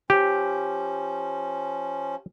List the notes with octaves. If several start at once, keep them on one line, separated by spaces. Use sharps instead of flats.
F3 C#4 G4